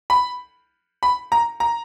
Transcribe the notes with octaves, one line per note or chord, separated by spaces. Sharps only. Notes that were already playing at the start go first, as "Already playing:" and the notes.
B5
B5
A#5
A#5